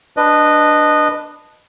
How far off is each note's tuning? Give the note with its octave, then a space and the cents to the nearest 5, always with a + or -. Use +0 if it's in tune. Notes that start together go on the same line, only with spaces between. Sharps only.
D4 +0 B4 +0 D#5 -15